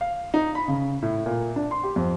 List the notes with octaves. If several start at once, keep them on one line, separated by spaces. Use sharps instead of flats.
F5
D#4
B5
C#3
A2
A#2
D4
C6
G4
F2